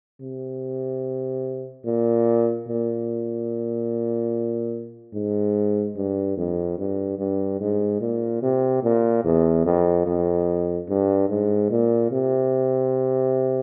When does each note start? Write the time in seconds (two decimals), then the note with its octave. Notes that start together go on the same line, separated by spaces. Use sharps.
0.22 C3
1.86 A#2
2.68 A#2
5.14 G#2
5.96 G2
6.38 F2
6.78 G2
7.19 G2
7.61 G#2
8.01 A#2
8.43 C3
8.84 A#2
9.25 E2
9.66 F2
10.07 F2
10.89 G2
11.30 G#2
11.71 A#2
12.12 C3